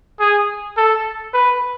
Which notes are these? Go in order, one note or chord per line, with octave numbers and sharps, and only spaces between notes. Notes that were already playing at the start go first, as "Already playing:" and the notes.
G#4
A4
B4